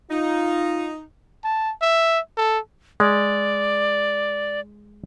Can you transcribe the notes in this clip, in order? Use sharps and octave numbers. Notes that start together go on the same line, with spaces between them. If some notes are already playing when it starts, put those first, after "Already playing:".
D#4 F4
A5
E5
A4
G#3 D5